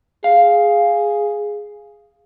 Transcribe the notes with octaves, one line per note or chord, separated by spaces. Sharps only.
G#4 F5